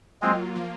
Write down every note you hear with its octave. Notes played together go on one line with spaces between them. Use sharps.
F#3 G#3 A#3 C4 F4
F3 A#3 F4